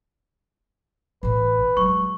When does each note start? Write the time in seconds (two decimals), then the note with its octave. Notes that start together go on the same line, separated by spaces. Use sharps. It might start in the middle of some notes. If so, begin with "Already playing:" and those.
1.23 A1 A2 B4
1.77 F#3 G#3 C#6